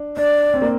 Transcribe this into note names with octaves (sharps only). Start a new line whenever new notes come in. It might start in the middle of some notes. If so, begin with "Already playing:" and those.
Already playing: D4
D4 D5
C4
A#3